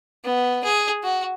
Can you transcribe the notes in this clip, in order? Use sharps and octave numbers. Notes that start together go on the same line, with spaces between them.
B3
G#4
F#4